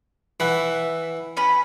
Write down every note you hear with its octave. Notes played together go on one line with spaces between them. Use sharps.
E3 E5 F#5
C#4 B4 B5